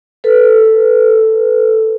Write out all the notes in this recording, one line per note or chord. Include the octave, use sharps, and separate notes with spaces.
A4 B4